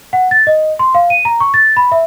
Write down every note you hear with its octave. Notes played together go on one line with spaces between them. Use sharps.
F#5
A6
D#5
C6
F5
D#7
A#5
C#6
A6
B5
E5